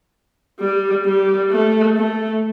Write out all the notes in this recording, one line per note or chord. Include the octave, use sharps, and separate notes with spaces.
G3
G3
A3
A3